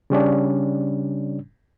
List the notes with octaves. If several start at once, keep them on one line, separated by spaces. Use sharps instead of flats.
C#3 G3 C#4 D4